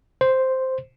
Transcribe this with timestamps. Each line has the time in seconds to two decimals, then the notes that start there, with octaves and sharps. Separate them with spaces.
0.21 C5